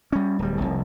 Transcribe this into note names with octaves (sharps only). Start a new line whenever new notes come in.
G3 C#4
D1 G3
F1 C2